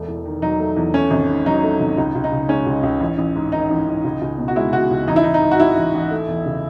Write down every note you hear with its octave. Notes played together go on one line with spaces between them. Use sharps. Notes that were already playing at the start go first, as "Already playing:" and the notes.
Already playing: E1 A3
E2
D#3
F#3 D#4
A3
E2
A3 C#4
G#1
G#2
F#3 D#4
A3
G#1
C#2 D#4
C#2
D#4
C#3
G#3 C#4
C#2
C#2
A1
A1
G#2
D#3 D#4
A1
A1
C#2
C#2
B2
F#4
G#3 E4
C#2 F#4
C#2
A1 D#4
E4
A1 D#4
D#4
G#2
F#4
E3 E4
A1
A1
A3
E2
C#3